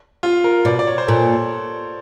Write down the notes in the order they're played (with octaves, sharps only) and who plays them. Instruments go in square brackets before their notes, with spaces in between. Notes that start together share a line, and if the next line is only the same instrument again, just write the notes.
[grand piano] F4
A#4
[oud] B2 [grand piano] D5
[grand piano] D5
C#5
C5
[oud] A#2 [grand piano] A4